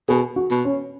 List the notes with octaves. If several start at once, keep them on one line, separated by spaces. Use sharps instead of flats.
B2 G#4
F#4
B2
C#4